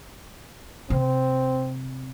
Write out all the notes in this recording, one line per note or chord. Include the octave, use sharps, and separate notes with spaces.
C3 C4